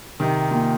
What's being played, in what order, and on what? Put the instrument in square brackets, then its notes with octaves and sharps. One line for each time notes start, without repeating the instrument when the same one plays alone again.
[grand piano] C3 D#3
A#2